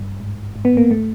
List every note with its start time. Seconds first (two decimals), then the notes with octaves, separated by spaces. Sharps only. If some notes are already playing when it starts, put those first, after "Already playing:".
Already playing: G2
0.20 G#2
0.56 G#2
0.65 B3
0.77 A#3
0.91 A3